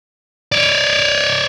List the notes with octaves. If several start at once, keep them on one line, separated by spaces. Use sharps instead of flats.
C#5 D5